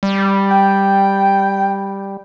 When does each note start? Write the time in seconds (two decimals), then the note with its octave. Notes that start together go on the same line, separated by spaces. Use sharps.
0.03 G3
0.51 G5